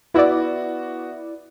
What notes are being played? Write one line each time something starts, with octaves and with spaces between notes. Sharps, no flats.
B3 E4 F#4 D5